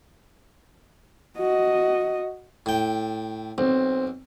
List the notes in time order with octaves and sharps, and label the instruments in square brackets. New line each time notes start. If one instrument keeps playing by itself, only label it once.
[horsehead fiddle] F#4 D#5
[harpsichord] A2 G5
[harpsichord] B1 [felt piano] C4